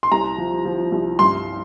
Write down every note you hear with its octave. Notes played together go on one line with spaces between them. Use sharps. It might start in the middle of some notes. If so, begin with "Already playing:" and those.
C6
C2 A#5
F3
F3
C2
G2 C6